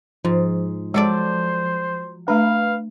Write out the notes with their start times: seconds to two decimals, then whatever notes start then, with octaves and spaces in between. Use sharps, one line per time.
0.25 G#2 F3
0.94 F#3 G#3 A4 C5 D5
2.28 A3 D4 B4 F5